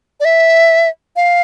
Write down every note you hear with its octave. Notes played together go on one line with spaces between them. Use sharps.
D5
E5
F5